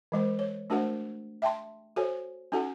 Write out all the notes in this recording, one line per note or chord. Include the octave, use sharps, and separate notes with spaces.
E3 G#3 C5
C#5
A3 D4 F#4 A#4 C5 F#5
E5 G5 A5 C6
F#4 A4 C5 C#5 G#5
C#4 D#4 F#4 A4 F#5 G#5